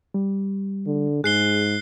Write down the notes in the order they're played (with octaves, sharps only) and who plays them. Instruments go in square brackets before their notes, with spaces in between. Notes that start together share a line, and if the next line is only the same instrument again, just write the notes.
[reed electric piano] G3
[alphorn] D3
[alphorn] G#2 [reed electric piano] G#4 [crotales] F#6 C7 G7